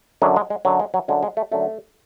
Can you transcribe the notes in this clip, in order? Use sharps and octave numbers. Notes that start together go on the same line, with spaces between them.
F#2 D3 F#3 G#3
G#3
G#3
F#2 D3 F#3
G#3
F#3
F#2 D3 F#3 G#3
G#3
A3
F#2 D3 F#3 A3